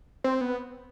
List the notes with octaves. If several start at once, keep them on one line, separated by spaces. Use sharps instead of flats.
C4
B3